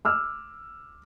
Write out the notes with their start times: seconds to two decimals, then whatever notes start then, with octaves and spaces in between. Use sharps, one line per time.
0.05 D6 E6 F6